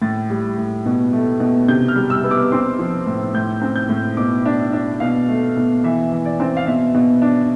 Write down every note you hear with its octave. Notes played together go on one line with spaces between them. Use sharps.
A2 A6
G3
A2
B2
A3
B2
C3 G6
F6
G3
E6
B3
D6
C4 C6
F3
A2
A2 G6
C4
G6
A2
B2 D6
D4
D4
B2 F5
A3
B2
E3 E5
E3
D5
C4
F5
B2 E5
B2
D4